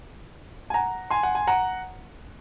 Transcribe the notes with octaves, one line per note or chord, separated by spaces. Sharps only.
G#5
F#5 A#5
G#5 C6
F#5
G#5
F#5 A#5